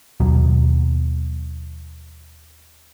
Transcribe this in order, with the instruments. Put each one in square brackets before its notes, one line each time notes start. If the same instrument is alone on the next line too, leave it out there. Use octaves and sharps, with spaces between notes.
[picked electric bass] D#2 B2 F#3